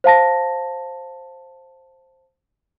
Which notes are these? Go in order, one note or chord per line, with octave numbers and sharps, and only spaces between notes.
C5 F5 A5 A#6